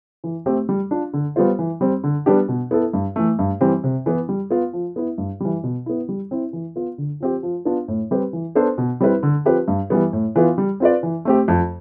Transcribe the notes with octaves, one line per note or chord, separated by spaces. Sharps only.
E3
A3 C4 G4
G3
D4 F4
D3
G3 B3 F4 C5
E3
G3 C4
D3
G3 B3 D4 G4
B2
B3 E4 A4
G2
E3 A3
G2
E3 G3 C4 G4
C3
E3 B3 E4
G3
B3 F4
F3
B3 E4
G2
E3 G3
B2
B3 E4
G3
C4 E4
E3
B3 F4
D3
F3 C4 G4
F3
B3 D4 F4
A2
G3 C4 G4 B4
E3
B3 D4 A4 C5
B2
G3 C4 E4 B4
D3
F3 C4 G4 B4
G2
E3 G3 B3
A2
E3 B3 F4
G3
C4 F4 B4 D5
E3
A3 C4 G4
F2